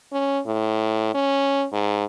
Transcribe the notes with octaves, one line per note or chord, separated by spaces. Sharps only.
C#4
A2
C#4
G#2